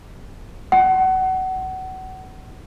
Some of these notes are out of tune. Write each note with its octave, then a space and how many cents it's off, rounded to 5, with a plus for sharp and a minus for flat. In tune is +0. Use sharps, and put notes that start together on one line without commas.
F#5 +25